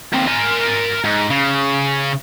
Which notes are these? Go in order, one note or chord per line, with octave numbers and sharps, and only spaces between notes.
D#2 C4
A#4 G#5
G#2
C#3